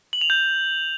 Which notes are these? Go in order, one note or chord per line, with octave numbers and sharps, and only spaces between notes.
F#7
F7
G6